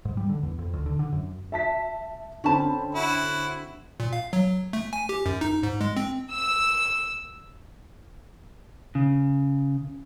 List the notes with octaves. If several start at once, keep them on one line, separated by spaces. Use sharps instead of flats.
G#2
G3
D3
E2
F2
D2
D3
D3
F#2
E5 A5 B6
D3 C4 C#4 A5 B5
E4 F#4
A#2
F5
F#3
A3
G#5
G4
F#2
D#4
G#2
G#3
C4
E6
C#3